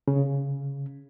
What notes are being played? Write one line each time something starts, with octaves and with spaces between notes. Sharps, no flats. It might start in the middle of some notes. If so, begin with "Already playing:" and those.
C#3